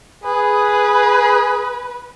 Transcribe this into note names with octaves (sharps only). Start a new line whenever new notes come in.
G#4 B4